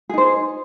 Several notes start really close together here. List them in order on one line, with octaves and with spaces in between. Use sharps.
G#4 D#4 C5